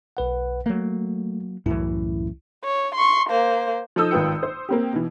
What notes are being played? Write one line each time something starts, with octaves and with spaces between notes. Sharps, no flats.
B1 B4 F#5
F#3 A3 A#3
C2 F#2 A2 E3 E4
C#5
C6 C#6
A#3 C5
F3 D#4 A4 D#6 E6 G6
G#1 D#3 F4 B4 G5 C#7
C5
A#3 C4 G4
B2 E3